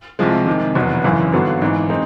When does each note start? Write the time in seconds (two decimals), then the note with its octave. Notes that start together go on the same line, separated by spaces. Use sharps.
0.19 C2 C3 F3 G#3
0.46 C3 D#3 G#3
0.75 F1 E2 B2 F#3 B3
1.04 G#1 F#2 C#3 E3
1.33 G#1 G2 D3 F#3 B3
1.62 G#1 G#2 E3
1.90 G#3 C4 D#4